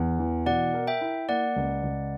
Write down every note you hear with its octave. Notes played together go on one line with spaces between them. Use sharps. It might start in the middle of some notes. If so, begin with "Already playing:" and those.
Already playing: E2
E3
B2 D5 F#5
A#4
E5 G5
E4
A#3 D5 F#5
C#2
C#2